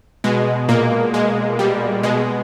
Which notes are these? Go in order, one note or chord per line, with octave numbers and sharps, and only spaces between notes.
B2 G#3
A#2 A#3
G#3
G3
B2 G#3